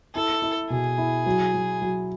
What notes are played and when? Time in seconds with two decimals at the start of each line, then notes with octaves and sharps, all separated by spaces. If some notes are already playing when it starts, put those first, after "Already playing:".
0.15 E4 A4
0.42 E4
0.70 B2 G#4
0.98 E4
1.26 F#3
1.54 F#3
1.82 F#3